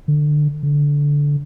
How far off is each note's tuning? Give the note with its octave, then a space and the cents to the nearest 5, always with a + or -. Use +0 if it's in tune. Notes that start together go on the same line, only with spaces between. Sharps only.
D3 +20
D3 -15